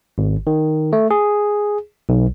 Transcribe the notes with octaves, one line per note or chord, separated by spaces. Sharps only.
G#1
D#3
A3
G#4
B1